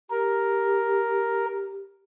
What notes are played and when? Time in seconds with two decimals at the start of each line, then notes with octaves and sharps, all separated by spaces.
0.10 G4 A#4